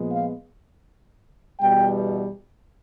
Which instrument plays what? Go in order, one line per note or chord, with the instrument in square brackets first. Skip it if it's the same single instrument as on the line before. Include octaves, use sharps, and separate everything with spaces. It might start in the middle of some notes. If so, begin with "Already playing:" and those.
Already playing: [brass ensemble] A#2 F3 G#3 B3
F5
E2 B2 G3 G5